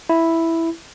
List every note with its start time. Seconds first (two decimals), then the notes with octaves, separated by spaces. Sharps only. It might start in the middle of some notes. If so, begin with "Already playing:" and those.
0.09 E4